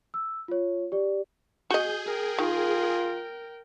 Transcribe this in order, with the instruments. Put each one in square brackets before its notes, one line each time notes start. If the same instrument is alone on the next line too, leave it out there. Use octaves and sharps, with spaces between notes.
[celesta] E6
F4 C#5
G4 D5
[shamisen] F#4 D#5 [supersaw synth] G#4 [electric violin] G6
[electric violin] A#4 G5
[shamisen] D#3 [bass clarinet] F4